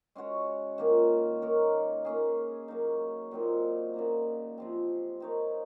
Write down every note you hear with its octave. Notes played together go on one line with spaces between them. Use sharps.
G#3 C#4 F#4 C#5
D#3 A#3 C#4 F4
A#3 D#4 A#4 C#5
A#3 C#4 G#4
F#3 A#3 D#4
A#2 F#3 C4 D#4
C#3 F#3 A#3 D#4
C3 F3 C4
C4 D#4 A#4 C#5